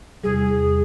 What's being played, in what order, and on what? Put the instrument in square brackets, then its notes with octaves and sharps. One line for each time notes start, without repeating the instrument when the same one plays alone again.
[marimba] E2 C3 G3 [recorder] G#4